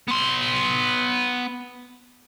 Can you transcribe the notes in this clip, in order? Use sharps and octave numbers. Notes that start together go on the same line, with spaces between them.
B3 C6